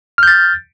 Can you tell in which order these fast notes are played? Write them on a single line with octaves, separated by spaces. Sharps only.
F6 G6 A6